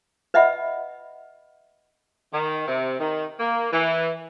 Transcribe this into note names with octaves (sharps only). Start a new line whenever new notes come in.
B4 D#5 E5 F#5 B5
D#3
C3
D#3
A#3
E3